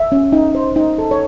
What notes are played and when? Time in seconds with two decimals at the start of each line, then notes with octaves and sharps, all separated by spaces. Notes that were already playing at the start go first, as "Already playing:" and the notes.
Already playing: E5
0.12 C#4
0.32 D#4
0.55 C5
0.76 D#4
0.98 A4
1.11 C#5